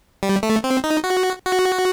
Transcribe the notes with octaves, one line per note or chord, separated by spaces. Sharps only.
G3
A3
C4
D#4
F#4
F#4